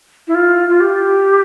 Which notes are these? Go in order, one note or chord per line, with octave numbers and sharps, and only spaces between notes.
E4
F4
F4
G4